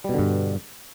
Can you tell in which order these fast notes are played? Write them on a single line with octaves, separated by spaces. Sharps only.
G3 B2 D3 G2